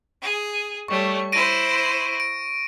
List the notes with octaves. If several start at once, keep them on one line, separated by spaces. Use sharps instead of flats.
G#4
G3 A3 C#5 C#6
E4 C5 A#6 D7 D#7
D7